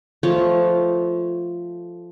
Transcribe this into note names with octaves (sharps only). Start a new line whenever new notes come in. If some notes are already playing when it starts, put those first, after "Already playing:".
F3 A3 C#5 A5